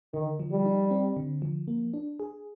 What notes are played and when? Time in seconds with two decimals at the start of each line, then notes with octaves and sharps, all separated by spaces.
0.14 D3 D#3
0.39 F3
0.52 G3
0.66 D#4
0.91 C4
1.17 D3
1.42 F3
1.68 A#3
1.94 D4
2.20 G#4